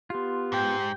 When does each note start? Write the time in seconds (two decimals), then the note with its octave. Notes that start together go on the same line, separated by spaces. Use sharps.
0.10 B3 F4 G4 C6
0.52 G#2 G5